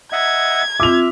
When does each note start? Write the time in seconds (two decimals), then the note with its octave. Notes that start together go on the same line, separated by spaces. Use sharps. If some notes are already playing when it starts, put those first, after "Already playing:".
0.13 D#5 E5 F#5 G#6
0.80 C4 F4 E5 D6 F7